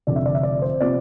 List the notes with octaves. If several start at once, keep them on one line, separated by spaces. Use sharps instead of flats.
F1 F2 D3 D5
E5
D5
E5
D5
C5
C3 F3 B3 D5